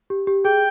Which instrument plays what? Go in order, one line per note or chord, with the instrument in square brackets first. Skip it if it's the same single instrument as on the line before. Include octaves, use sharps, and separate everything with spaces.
[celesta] G4
G4
[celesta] G#4 [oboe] G5